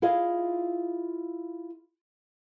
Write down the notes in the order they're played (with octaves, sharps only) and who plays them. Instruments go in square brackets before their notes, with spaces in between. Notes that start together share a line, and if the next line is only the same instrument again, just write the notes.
[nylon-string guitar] E4 F4 G#4 D#5 F5